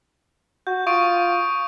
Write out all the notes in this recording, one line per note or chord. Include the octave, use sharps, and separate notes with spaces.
F#4 G6
F4 C#6 D#6 D7